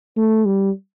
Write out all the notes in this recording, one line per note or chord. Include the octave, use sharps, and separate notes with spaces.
A3
G3